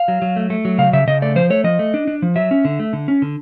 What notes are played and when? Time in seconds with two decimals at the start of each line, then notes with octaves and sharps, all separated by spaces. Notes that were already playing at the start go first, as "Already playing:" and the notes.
Already playing: F5
0.08 F#3
0.22 F#3
0.36 A3
0.50 A3
0.65 F#3
0.78 C#3 F5
0.93 C#3 E5
1.07 C#3 D#5
1.22 A3 D5
1.36 F3 C5
1.50 A3 C#5
1.64 F3 D#5
1.79 A3
1.94 D4
2.07 D4
2.22 F3
2.36 F#3 E5
2.51 C#4
2.65 D3
2.79 A3
2.93 D3
3.08 C#4
3.22 D3